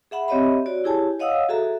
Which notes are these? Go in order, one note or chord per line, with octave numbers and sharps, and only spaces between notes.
G#4 E5 F#5 B5
C4 G4 C#5 D#5 E5 B5
F#4 C#5 D5
E4 G4 G#4 C#5 G#5 A5
C#5 D#5 F5 F#5 D#6 E6
F#4 G#4 A4 E5 A#5